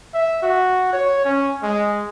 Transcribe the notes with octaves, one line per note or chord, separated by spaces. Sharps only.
E5
F#4
C#5
C#4
G#3